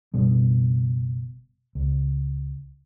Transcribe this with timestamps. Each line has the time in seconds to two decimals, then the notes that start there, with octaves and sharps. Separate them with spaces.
0.14 F#1 B2 G3
1.75 C#2